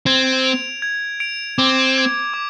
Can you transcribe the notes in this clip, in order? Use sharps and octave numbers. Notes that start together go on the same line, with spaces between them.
C4 G#6
D7 F7
G#6
D7 F7
C4 D6
G#6 D7
D6